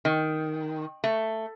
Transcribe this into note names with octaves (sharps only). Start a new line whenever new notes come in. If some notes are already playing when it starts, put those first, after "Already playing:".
D#3
A3